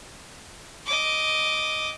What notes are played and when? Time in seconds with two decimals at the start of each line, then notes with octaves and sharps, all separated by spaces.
0.86 D#5 D6